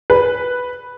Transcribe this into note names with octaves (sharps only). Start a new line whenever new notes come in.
B4